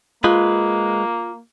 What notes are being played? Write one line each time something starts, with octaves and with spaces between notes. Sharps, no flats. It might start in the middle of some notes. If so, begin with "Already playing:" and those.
G#3 A#3 F4 B4